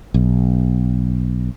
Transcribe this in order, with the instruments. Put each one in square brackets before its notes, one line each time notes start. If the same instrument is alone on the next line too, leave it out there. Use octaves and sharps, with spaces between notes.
[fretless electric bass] B1